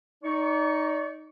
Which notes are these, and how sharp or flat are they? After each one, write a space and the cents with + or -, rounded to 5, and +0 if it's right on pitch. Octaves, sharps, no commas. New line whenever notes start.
D#4 +0 D5 -35 C#6 +0